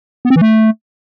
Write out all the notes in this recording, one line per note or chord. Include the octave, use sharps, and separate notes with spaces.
B3
C4
E3
A3